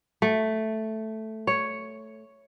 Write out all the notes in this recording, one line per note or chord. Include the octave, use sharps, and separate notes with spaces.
A3
C#5